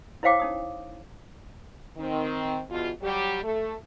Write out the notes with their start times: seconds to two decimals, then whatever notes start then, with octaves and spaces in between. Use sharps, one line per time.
0.23 E4 C5 C#5 F5 G5 D6
0.40 C#4 D#4 D#6
1.98 D#3 C4
2.69 E2 B2 F4
3.02 F#3 G3 G4
3.43 A3 A4